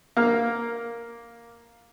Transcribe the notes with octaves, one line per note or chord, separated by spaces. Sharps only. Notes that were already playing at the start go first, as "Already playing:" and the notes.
A#3 F6